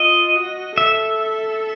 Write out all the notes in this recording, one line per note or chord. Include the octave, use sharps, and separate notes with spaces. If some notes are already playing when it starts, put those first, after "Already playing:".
Already playing: F4 D#5
F#4
A4 E5